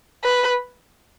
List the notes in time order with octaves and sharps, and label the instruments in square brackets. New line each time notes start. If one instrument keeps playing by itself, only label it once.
[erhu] B4